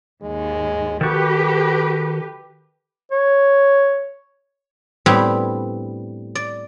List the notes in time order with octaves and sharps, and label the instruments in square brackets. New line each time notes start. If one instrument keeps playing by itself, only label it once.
[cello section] D#2 G#2 [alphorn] G#3
[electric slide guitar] D#3 F#4 [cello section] G4 B4 [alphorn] A4
[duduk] C#5
[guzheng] A2 G3 B3 C4 D4
D5